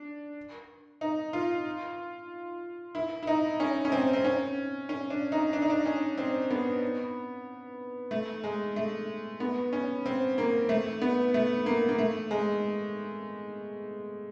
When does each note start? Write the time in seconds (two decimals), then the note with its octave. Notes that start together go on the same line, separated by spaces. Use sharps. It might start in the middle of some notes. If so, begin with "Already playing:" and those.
Already playing: D4
1.01 D#4
1.33 F4
2.95 E4
3.23 E4
3.27 D#4
3.60 C#4
3.85 C#4
3.92 C4
4.13 C4
4.25 C#4
4.89 C#4
5.10 D4
5.32 D#4
5.53 D4
5.62 D#4
5.70 D4
5.86 C#4
6.18 C4
6.51 B3
8.11 A3
8.44 G#3
8.76 A3
9.40 B3
9.73 C#4
10.06 C4
10.38 A#3
10.69 A3
11.02 B3
11.34 A3
11.66 A#3
11.89 A#3
11.98 A3
12.31 G#3